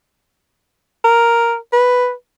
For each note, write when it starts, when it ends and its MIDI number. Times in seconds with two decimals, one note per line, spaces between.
1.04 1.55 70
1.73 2.11 71